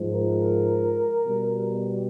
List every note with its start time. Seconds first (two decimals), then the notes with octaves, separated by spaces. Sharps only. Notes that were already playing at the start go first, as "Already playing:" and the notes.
Already playing: G#2 F3
0.12 A#4
1.26 B2 G3